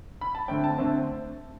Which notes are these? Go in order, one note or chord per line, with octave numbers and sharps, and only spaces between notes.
B5
A5
D3 A3 C4 G5
A5
D3 A3 C4